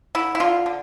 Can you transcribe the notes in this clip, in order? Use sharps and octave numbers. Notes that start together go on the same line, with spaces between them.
D3 E4
E4
D3 F4
D3